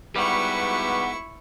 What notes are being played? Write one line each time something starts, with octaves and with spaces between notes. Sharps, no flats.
G#2 G3 B3 E4 F#4 B4 F#5 C#6